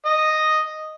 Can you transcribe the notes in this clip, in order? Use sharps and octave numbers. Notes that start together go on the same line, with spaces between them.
D#5